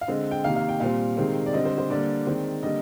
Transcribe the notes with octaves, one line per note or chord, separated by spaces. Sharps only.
F5
D3 G#3 C4 D#5
G5
C3 D#3 A#3 F5
F5
G5
A#2 G3 C4 F5
C3 D#3 G#3 C4
D5
D3 G3 C4 D#5
C5
C5
D3 G3 A#3 D5
D#3 G#3 C4
D3 G3 A#3 D#5